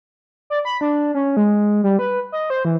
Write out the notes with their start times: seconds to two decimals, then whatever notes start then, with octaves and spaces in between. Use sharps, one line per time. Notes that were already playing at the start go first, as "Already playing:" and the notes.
0.50 D5
0.65 B5
0.81 D4
1.14 C#4
1.37 G#3
1.84 G3
1.99 B4
2.32 D#5
2.50 C5
2.65 E3